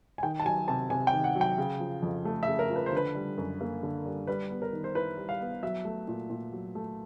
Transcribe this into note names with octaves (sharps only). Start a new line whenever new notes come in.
G#5
D#3 G5
A5
F#3 G#5
C3 A5
C3 G#5
G5
D#3
F#5
F#3
G5
C#3
F3
F2
A3
E5
C#3
A#4
F3
B4
C5
D3 B4
G3
F#2
A#3
D3
G3
G3 B4
B3
A#4
D#3
C5
E4 B4
G3
F5
B3
F#3 E5
A3
A#2
A#2
F#3
A3